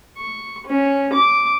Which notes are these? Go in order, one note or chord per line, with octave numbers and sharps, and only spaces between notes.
C#6
C#4
D6